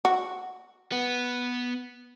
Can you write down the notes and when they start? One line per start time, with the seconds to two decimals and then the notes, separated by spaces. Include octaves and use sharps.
0.05 F#4
0.92 B3